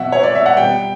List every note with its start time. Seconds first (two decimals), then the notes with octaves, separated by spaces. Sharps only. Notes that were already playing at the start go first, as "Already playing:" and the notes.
Already playing: B2 F#3 E5 F#5
0.12 C#5
0.23 D5
0.35 E5
0.46 F#5
0.57 B2 G3 G5